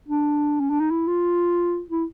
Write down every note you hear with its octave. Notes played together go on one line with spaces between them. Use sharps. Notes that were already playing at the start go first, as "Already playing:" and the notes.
D4
C#4
D4
D#4
E4
F4
E4